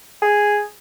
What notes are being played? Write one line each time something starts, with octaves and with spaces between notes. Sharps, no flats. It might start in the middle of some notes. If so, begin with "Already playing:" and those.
G#4